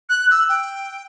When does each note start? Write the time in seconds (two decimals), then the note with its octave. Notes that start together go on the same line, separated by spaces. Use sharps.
0.09 F#6
0.31 E6
0.49 G5